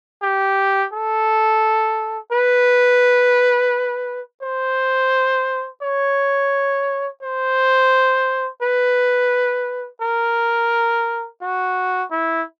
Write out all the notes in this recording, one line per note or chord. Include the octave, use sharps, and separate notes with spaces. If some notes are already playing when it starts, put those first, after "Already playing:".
G4
A4
B4
C5
C#5
C5
B4
A#4
F#4
E4